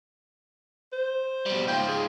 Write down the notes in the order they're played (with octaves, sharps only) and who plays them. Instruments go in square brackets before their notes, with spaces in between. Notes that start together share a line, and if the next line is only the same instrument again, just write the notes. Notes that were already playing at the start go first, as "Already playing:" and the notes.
[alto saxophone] C5
[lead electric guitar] B2 G3
[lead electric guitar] G#2 F4 [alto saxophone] G5
[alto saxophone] G#4